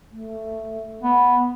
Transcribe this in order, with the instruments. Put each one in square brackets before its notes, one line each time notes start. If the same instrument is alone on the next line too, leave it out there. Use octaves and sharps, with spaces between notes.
[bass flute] A3
[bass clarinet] B3